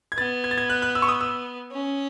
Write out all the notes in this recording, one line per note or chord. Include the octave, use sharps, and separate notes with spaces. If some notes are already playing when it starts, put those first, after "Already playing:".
G#6
B3 A6
G#6
A6
G#6
F#6
F#6
E6
C#6
D#6
E6
C#4